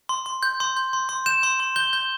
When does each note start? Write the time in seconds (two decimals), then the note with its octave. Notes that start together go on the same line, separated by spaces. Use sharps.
0.09 C6
0.26 C6
0.43 G6
0.60 C6
0.77 G6
0.93 C6
1.09 C6
1.26 G6 E7
1.43 C6
1.60 C6
1.76 G6 G7
1.93 G6